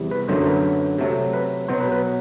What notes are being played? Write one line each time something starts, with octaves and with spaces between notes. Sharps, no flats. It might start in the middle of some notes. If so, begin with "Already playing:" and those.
Already playing: E2 C3 G3
B4
F#2 D3 F#3 A3 C5
C5
B4
C3 F#3 A3
B4
B2 F#3 B3 C5
B4
B4